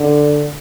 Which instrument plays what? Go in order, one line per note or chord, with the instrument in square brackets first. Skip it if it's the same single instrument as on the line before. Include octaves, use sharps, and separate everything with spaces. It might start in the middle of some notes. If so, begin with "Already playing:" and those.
Already playing: [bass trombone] D3